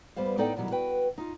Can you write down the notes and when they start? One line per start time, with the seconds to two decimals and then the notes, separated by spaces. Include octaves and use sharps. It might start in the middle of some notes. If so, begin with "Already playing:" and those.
0.16 G2 G3 B3 C5 F5
0.37 A2 B3 D#4 A4 D5 G5
0.56 F#2 B2 D#3 F#3 G3
0.71 F#4 B4 G5
1.18 D#4 F4